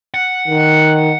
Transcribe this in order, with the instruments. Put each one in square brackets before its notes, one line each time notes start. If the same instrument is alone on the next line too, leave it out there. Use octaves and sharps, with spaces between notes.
[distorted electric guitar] F#5
[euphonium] D#3